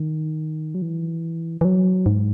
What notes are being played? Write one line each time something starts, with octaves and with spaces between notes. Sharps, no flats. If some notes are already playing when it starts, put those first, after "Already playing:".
Already playing: D#3
F#3
E3
E3
F#3
G#2